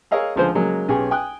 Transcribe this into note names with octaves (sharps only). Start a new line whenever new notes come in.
G#4 A#4 C#5 D#5 F5 E6
C#2 D3 F3 G#4 C5
C#3 F#3 G#3 A#3
B1 C#4 G4 G#4
G5 G#5 D#6 F#6